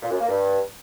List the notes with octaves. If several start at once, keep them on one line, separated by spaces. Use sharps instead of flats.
A#2
F#2
A#3
G2